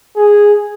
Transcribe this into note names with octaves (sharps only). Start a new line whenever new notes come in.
G#4